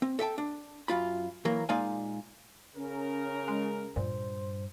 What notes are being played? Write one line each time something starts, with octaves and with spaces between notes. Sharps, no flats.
C4
A4 E5 G5 A5
D4
F#2 F4 B5
E3 F#3 A#3
A#2 G#3 D#4 D5 F5 G#5
C#3 C#4 A#4
G#3
G2 A#2 C5